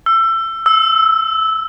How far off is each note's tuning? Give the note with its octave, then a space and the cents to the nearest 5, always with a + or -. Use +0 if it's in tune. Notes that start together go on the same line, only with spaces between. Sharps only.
E6 +25
E6 -15